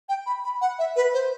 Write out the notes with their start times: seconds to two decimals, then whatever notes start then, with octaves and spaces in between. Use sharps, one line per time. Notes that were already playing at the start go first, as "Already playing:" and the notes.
0.09 G5
0.26 B5
0.44 B5
0.61 F#5
0.79 E5
0.96 B4
1.14 C5